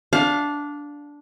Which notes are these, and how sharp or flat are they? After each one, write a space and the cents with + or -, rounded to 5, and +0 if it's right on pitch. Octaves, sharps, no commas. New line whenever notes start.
D4 -10 F5 +20